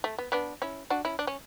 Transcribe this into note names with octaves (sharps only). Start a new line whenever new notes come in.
A3
B3
B3 D4
C#4 E4
D4 F#4
C#4 E4
D4
C#4